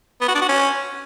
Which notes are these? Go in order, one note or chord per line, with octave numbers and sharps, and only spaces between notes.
B3
F#4
D4
F#4
C#4